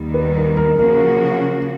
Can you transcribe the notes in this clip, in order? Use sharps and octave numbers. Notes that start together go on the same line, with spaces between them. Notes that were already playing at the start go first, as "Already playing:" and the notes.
Already playing: D#2 D#3 G3 B3
B4
A#4
A#4
C#3 F3 A#3 C#4 F#4 A#4